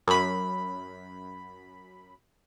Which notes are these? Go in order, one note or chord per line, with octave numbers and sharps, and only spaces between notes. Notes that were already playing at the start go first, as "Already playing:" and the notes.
F#2 B5